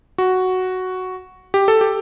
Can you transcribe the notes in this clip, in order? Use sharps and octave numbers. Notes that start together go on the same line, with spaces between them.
F#4
G4
A4
G4